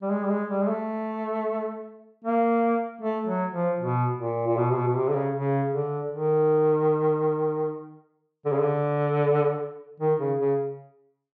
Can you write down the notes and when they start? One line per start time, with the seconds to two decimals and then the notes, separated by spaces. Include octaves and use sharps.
0.02 G3
0.10 G#3
0.24 G3
0.31 G#3
0.50 G3
0.63 G#3
0.68 A3
2.24 A#3
3.01 A3
3.27 F#3
3.54 F3
3.79 B2
4.18 A#2
4.46 A#2
4.57 B2
4.71 C3
4.76 B2
4.88 B2
4.96 C3
5.09 D3
5.16 C#3
5.34 C#3
5.74 D3
6.12 D#3
8.45 D3
8.53 C#3
8.60 D3
10.00 D#3
10.19 C#3
10.39 C#3